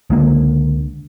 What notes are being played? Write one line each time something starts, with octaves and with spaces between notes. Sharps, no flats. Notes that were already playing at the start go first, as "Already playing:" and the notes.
C#2 D3 A#3